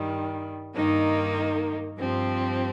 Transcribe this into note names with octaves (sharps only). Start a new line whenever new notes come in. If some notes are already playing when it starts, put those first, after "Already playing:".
Already playing: G2 D#3 G3
G2 D#3 A#3 D#4
G2 F3 C4 G4